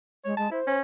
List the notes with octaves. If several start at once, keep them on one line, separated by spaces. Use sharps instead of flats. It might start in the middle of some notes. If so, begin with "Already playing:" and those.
G#3 C#5
G#3 A5
E4 C5
C#4